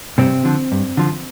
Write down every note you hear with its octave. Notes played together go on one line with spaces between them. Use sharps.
G2 C3 C4
D3 F3
G2
D3 F3